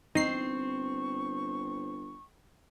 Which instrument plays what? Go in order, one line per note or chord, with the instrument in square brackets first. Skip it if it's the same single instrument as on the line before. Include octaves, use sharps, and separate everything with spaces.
[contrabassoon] G1 [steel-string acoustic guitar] C4 [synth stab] D#4 C7 [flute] C#6